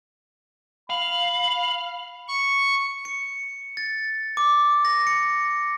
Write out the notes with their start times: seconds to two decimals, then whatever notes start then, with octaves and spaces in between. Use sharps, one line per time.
0.90 F5 B5 F#7
2.28 C#6
3.05 C#7
3.77 A6
4.37 D6
4.85 A#6
5.07 C#7